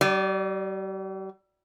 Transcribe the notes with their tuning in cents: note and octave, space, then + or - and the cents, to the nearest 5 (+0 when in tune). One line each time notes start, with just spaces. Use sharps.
G3 -40 D5 +15